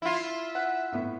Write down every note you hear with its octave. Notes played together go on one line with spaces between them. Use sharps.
E4 F4 E5
F#5
A2 B3